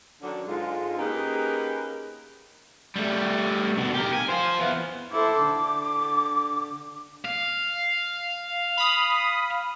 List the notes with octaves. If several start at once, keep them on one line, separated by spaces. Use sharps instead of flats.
D3 D#3 F#3 C#4 D4
G#2 D3 G#3 F4
A#3 C#4 D#4 G4 G#4 B4
G3 A3
B2 D3
G4 A#4
G#5
C5 F5
E3 B3
E4 A4 C5 D6
D3
F5
B5 D#6